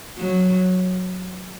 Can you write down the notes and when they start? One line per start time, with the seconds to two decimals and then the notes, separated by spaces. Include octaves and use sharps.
0.18 F#3